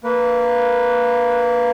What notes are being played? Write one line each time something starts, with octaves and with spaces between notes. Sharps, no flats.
A#3 B4